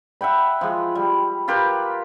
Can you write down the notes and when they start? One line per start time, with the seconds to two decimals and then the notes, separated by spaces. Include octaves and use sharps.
0.21 E5 F#5 G5 B5
0.61 F3 G#3
0.95 G3
1.48 F4 G4 A#4 B4